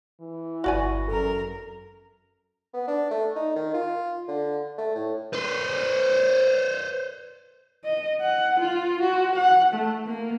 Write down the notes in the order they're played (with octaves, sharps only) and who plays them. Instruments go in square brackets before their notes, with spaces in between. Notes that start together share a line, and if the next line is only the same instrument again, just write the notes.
[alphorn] E3
[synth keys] G1 C#6 A#6 [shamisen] F#4 D5 G#5
[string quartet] F#2 A#4 A#5 [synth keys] A4
[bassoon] B3
D4
A3
D#4
D#3
F4
D3
A3
A2
[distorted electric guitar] B4 C5
[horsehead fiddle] D#5
F#5
F4
F#4
F#5
A3
A#3